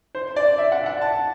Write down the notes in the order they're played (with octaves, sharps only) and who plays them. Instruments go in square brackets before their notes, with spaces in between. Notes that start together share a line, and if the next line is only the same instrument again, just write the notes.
[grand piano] C5
D5
E5
F#5
F#5
A5